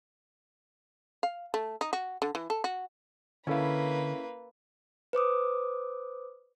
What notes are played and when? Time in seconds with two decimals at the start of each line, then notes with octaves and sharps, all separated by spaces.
1.23 F5
1.54 A3
1.81 D#4
1.93 F#4
2.22 D3
2.35 E3
2.50 A4
2.64 F#4
3.47 D3 A#3 C#4 E4 A4 B4 F5
5.13 B4 C5 D6 D#6